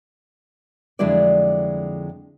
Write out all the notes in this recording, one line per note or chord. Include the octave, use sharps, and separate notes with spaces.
F2 D3 F#3 G#3 E4 D5